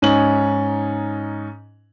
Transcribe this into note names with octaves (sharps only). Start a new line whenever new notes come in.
G#2 C#4 D#4 G#5 F#7